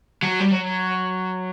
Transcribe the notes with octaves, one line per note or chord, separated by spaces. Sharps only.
F#3
G3
F#3